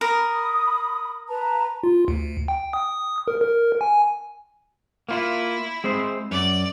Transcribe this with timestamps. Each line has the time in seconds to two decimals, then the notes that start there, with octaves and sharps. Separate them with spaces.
0.01 A#4 B5 D#6
1.29 B4 A5 A#5
1.83 F4
2.08 D2
2.48 G5
2.73 D#6
3.28 A#4
3.40 A#4
3.81 G#5
5.09 A#3 E4 F4
5.84 G#3 C4 C5
6.31 F#2 D5